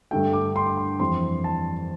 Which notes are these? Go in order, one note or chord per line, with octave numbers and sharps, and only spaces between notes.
G2 D3 A3 G5
D6
C6
D6
C6
F2 E3 G3 C6
A5